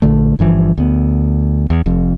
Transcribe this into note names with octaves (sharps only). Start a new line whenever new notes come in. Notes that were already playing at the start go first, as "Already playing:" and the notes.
A#1 D3 A3
G1 G2 E3 F3
D2 B3
E2
F1 F2